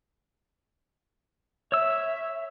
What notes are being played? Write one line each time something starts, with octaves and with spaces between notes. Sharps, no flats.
C#5 E5 E6